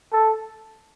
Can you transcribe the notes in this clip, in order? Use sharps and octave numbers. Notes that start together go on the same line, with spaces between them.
A4